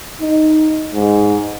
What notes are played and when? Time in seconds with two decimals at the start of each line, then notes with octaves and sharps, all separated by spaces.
0.21 D#4
0.94 G#2